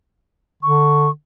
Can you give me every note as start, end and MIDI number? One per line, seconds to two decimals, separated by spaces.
0.63 1.09 50
0.63 1.10 85